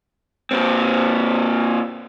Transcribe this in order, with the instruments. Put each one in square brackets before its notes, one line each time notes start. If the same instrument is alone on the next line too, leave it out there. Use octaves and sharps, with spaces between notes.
[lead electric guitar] A#2 C4